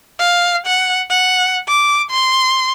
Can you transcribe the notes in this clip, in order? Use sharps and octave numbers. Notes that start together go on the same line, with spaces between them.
F5
F#5
F#5
D6
C6